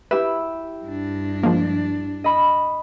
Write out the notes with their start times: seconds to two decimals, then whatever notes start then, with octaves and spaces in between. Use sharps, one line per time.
0.11 E4 G4 B4 E5
0.85 G2 D4
1.43 F3 G#3 A#3
2.24 D#5 B5